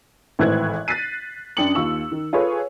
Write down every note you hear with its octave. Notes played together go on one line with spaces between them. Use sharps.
G#1 A2 E3 C5 F#6 G#6
F#6 A6 B6 C7 D#7
F#2 D4 G5 D#6 C#7 F#7
D#2 F4 C#6 E6
D#3
F4 G#4 A4 B4 C#5